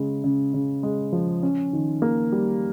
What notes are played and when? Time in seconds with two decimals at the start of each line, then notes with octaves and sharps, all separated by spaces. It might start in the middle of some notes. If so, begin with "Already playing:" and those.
Already playing: C#3 G#3
0.24 C#3
0.54 C#3
0.83 G#3
1.13 F3
1.43 C#4
1.73 D#3
2.02 A#3
2.32 G3